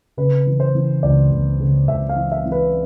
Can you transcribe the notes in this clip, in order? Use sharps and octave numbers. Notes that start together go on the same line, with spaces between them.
C#3 B4
E3
C5
E3
C#2 D5
C#2
C#3
C#2 E5
F5
E3
E5
E3
B4